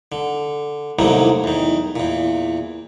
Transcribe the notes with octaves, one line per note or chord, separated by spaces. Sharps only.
D3
C2 A2 D3 D#3 F#3 A#3
E2 D#3
E2 A#2